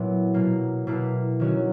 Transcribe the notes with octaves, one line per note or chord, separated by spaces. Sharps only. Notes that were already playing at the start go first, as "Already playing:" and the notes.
Already playing: A#2 F#3 B3 E4 F#4
B2 F#3 A#3
B2 A#3 E4
D#3 F#3 C#4 F#4